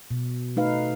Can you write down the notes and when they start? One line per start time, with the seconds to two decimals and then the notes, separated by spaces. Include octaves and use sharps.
0.11 B2
0.56 A3 D#4 B4 F5